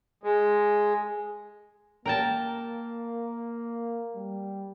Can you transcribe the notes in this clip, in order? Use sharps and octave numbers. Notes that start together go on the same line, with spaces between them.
G#3
A#3 A#4 G5 A5
G3